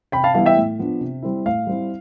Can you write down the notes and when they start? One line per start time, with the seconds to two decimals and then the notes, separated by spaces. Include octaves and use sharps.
0.12 C3 G5 B5
0.24 F5 A5
0.35 E3 G3 B3 E4 F5
0.46 E5 G5
0.56 A2
0.79 F3 B3 D4
1.01 C3
1.23 G3 C4 E4
1.46 A2 F5
1.67 G3 C4 E4